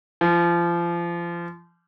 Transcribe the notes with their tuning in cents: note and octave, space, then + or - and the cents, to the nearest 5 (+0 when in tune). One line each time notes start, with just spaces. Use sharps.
F3 -30